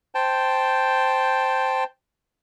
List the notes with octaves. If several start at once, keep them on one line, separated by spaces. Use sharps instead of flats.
C5 G5 A5